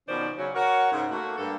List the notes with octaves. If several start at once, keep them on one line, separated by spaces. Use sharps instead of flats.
B2 D#3 F3 C#4 C5 D5
C#3 F#3 C#4
F#4 A#4 C#5
G#2 C#3
A3 A#3 F#4
G2 A#3 A4